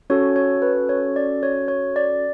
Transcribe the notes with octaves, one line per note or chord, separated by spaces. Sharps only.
C#4 F#4 A4 C#5
C#5
B4
C#5
D5
C#5
C#5
D5